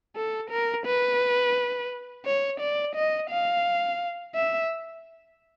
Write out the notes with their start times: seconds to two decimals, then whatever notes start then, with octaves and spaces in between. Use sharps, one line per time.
0.16 A4
0.50 A#4
0.86 B4
2.26 C#5
2.60 D5
2.95 D#5
3.30 F5
4.35 E5